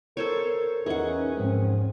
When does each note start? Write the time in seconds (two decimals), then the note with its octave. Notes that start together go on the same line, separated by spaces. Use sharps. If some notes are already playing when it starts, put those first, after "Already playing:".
0.17 A4 A#4 C5 C#5
0.86 E2 C#4 D#4 G#4 A#4 B4 E5 F#5
1.37 G#2 F3 G#3 C4